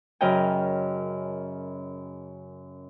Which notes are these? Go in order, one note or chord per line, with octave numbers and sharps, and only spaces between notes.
F#2 C#3 A#4 D#5 G5